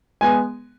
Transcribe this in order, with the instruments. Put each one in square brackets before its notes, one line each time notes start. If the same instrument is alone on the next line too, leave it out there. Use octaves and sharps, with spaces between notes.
[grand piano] G#3 B3 G#5